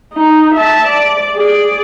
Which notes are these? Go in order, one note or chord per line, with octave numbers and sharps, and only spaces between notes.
D#4
E5 A5
D5
G#4 D5